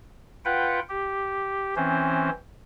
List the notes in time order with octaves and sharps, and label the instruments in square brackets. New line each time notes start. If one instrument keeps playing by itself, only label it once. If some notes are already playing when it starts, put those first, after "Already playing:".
[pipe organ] F4 B4 F#5 G5
G4
E3 C4 C#4 C5